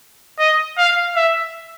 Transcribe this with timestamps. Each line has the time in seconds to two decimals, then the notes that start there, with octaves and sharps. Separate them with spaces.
0.39 D#5
0.78 F5
1.16 E5